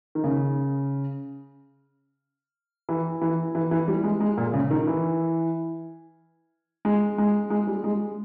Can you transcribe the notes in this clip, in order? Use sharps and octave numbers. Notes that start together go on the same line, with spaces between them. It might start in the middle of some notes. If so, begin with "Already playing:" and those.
D#3
C#3
E3
E3
E3
E3
G3
G#3
G#3
A#2
C#3
D#3
E3
G#3
G#3
G#3
G3
G#3